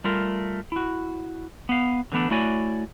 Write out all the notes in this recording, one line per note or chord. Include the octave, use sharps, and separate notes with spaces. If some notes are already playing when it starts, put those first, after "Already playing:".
G3 A3 F4 A#4
E4 F#4
B3 F5
D3 E3 A3 B3 D4
A3 E4 F#4 C#5 D5 G#5